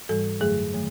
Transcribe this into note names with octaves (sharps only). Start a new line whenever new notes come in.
G#2 E3 G3 A4
F#2 D3 F#3 A3 G#4
D#3 F#3 A3